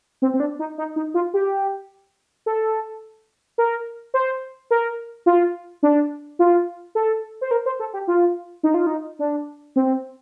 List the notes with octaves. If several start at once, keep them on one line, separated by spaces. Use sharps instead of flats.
C4
C4
D4
D#4
D#4
D#4
F4
G4
A4
A#4
C5
A#4
F4
D4
F4
A4
C5
A#4
C5
A4
G4
F4
D#4
F4
D#4
D4
C4